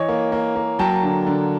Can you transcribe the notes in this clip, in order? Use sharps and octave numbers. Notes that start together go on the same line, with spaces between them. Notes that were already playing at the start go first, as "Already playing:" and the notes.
Already playing: E3 C#5 D#5
A#3
A#3
A#3
F#3 G5 A5
D3
D3